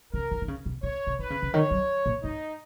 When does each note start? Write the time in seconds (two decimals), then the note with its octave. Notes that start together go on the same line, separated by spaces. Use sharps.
0.13 C#3 A#4
0.31 D#3
0.41 D#3
0.48 C#3
0.66 B2
0.83 A#2 C#5
1.07 B2
1.19 D#3 B4
1.30 C#3
1.42 C#3
1.53 D#3 C#5
1.71 F#3
2.06 A#2
2.23 G#2 D#4